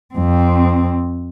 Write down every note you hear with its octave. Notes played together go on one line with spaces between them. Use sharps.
F2 C4